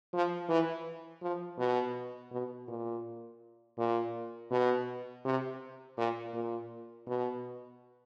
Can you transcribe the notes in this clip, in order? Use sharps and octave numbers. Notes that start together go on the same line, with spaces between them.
F3
E3
F3
B2
B2
A#2
A#2
B2
C3
A#2
A#2
B2